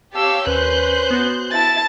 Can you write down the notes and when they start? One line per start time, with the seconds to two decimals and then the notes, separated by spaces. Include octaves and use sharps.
0.13 G4 C#5 F5 A5 E6
0.47 D#2 C#4 B4 C5 F#6 G6
1.10 B3 F#4
1.52 E4 A5 A6